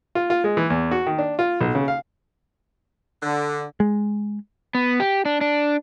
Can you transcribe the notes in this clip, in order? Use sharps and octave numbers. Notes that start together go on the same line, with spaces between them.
F4
F4
G#3
E3
E2
F#4
D#3
D4
F4
B1
C#3
F5
D3
G#3
B3
G4
D4
D4